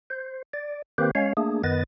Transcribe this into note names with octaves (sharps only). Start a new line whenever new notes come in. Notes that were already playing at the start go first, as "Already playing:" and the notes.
C5
D5
D#3 A#3 C4 G4 B4 C5
G#3 C#4 C#5 F5
A3 A#3 D4 G#4
F#2 D#3 B3 B4 D#5 A6